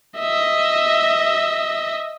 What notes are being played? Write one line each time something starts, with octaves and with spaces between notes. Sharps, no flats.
D#5 E5